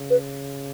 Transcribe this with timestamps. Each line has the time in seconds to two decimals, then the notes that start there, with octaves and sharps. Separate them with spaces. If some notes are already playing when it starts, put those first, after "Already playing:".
Already playing: C#3
0.10 B4